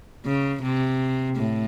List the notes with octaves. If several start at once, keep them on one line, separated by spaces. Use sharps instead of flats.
C#3
C3
A2